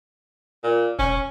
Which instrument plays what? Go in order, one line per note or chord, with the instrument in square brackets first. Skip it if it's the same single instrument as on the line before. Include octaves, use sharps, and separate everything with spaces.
[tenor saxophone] A#2
[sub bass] E1 [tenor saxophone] C#4